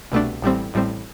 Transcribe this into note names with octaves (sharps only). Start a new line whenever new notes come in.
C2 B2 A3 D4
A1 A2 G3 C4
A1 A2 G3 C4